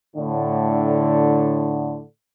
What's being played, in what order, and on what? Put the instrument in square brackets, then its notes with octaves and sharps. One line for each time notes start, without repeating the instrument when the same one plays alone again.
[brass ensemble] A2 D3